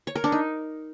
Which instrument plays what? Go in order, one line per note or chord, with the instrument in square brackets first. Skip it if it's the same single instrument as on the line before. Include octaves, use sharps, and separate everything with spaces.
[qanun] C#5
A#4
D4
D#4